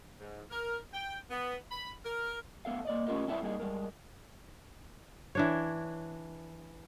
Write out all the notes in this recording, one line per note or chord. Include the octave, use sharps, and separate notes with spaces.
G#2
A#4
G5
B3
B5
A#4
F#2 A3 B3 A4 F5
A#3 D5 D#5
A3 C#4 F4 G4 A#4 D#5
G3 C4 E4 A4 D5 E5
G3 A#3 D#4 G#4
G3 G#3 A#4
E3 D4 C#5